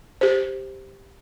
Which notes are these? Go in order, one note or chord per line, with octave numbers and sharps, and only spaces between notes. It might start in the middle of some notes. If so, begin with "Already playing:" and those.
G4 C5